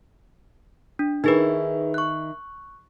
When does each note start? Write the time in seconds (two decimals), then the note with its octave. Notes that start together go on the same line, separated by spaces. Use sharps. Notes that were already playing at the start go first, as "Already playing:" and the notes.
0.99 D4
1.24 D#3 D#4 E4 G#4 B4
1.94 C#6 F#6